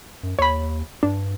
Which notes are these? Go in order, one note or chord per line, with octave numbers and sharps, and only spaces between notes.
F#2
D#2 C#5 B5
G2 D4